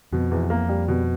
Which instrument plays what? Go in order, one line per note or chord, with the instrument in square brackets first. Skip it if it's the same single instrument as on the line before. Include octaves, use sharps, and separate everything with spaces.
[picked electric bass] F2 [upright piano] B2
[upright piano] E2
A#3
G3
B2